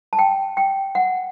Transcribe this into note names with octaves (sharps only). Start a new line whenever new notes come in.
A5
G5
G5
F#5